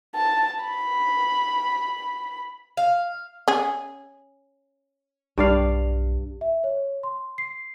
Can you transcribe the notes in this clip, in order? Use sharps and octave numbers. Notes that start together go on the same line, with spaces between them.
A5
B5
F5
C#4 G#4
B1 G2 D5 F5
E5
C#5
C6
C7